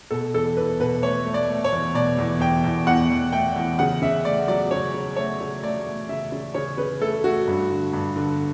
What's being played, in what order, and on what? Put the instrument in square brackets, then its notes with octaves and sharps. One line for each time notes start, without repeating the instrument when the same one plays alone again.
[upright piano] B2 A4
E2 A4
E2 B4
B2 B4
A3 C#5
A3
D5
A3
C#5
E2
B2 D5
E2
E2 G5
E2
E2 F#5
E2
A3 G5
E2
C#3 F#5
C#3 E5
A3 D5
F#3 D5
C#3 C#5
C#3
A3 C#5
C#3
A3 D5
A3
C#3 E5
C#3
C#3 C#5
C#3 B4
A3 A4
A3 F#4
G2
D3
G2
D3